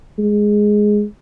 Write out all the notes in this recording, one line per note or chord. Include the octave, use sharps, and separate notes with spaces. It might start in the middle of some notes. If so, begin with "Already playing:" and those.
G#3